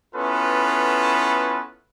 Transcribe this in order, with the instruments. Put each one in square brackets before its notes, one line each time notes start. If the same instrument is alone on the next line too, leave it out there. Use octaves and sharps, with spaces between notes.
[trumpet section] B3 C#4 E4 F4 A4 B4